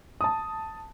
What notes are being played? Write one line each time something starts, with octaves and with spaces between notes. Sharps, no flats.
A5 D#6